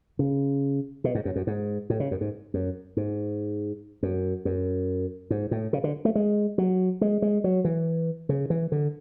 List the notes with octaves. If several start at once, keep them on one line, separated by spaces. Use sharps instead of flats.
C#3
B2
G#2
F#2
F#2
G#2
A2
C#3
F#2
G#2
F#2
G#2
F#2
F#2
G#2
A2
C#3
D3
A3
G#3
F#3
G#3
G#3
F#3
E3
C#3
E3
D3